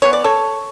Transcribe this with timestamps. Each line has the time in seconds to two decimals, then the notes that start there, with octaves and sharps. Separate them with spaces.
0.02 E3 G#3 B3 C#5
0.13 D5
0.24 A4 C#5